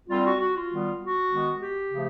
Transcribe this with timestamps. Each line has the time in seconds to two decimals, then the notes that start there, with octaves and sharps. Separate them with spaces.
0.09 D3 G3 C4 F4
0.25 F#4
0.39 F#4
0.55 F4
0.69 D#3 G3 B3
1.00 F#4
1.30 D#3 G#3 B3
1.60 G4
1.90 C#3 F3 A3